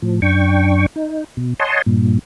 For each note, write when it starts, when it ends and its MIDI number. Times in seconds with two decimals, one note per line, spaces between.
0.02 0.20 45
0.02 0.20 53
0.22 0.86 42
0.22 0.86 62
0.22 0.86 79
0.22 0.86 85
0.96 1.24 63
1.37 1.54 47
1.60 1.82 73
1.60 1.82 75
1.60 1.82 78
1.60 1.82 80
1.60 1.82 81
1.60 1.82 84
1.86 2.19 43
1.86 2.19 46